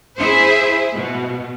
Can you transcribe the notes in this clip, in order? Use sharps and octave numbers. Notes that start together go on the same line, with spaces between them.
E4 G#4 C5 E5
B2